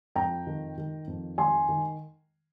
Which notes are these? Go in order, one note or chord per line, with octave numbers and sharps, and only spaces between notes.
F2 G5 A#5
D#3
D#3
F2
D#3 G#5 C6
D#3